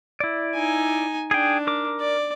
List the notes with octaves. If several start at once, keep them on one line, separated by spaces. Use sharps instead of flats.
E4 D5
D#4 G#5
D4 G#4 G5
A#4 D6
D5